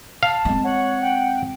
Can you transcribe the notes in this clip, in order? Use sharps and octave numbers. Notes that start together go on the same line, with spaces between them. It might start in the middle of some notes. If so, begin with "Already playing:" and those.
F5 A5
G#3 C4
C#5 F#5
G5